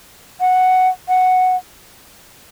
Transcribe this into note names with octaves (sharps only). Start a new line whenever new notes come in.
F#5
F#5